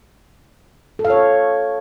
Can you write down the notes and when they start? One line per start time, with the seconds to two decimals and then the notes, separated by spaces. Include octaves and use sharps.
0.99 A4
1.05 F5
1.10 C#5